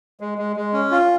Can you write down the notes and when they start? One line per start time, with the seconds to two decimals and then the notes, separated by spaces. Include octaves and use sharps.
0.20 G#3
0.38 G#3
0.56 G#3
0.73 C#4
0.91 F4